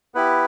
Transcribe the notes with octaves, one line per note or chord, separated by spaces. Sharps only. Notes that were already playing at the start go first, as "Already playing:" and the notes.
B3 E4 G4 B4